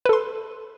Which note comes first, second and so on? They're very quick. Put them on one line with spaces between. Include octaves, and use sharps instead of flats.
B4 A4 C6